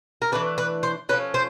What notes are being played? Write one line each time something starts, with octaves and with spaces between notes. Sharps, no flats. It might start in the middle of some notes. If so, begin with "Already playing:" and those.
A#4
E3 A3 D4 B4
B4
C5
F3 A3 C#4 B4
C5